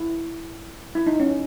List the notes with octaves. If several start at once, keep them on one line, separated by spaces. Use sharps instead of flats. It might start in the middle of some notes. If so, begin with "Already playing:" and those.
Already playing: E4
E4
D#4
C#4